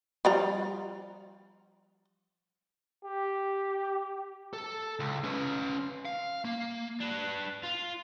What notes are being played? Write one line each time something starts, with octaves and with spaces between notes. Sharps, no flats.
F3 G3 A#5
G4
A4
C#2
C#4 B4
F5
A#3
D4 B4
F4